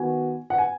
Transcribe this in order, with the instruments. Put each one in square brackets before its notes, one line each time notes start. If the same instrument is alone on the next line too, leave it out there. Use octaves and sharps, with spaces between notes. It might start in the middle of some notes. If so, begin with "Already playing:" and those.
Already playing: [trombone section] D#3 B3 F#4 [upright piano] G#5
[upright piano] F#5
G#5